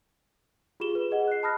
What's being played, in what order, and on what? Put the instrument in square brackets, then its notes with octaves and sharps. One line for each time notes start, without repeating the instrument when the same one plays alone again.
[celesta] F4 G4 G#4 E7 G7
B4
G#4 D#5 F#5
F#6 C7
A5 B5 D#6 F6 F#6 A#6